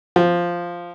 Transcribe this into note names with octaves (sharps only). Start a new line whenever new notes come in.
F3